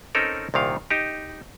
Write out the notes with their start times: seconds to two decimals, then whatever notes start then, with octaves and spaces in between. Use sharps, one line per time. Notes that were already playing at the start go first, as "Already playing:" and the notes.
0.15 C4 C#4 D#4 A4 A#4
0.54 C2 A#2 D#3 F5
0.90 D#4 G4